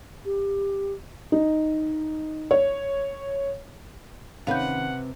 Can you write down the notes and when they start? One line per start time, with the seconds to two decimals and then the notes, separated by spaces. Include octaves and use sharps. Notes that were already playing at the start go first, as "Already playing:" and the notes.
0.25 G4
1.32 D#4
2.51 C#5
4.47 C3 D#3 C#4 B4 F5 F#5 G6